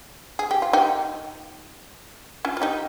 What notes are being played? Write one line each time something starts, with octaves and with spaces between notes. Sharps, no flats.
G#4
G4
F4
D#4 G4
C#4 F4
F4
D#4 G4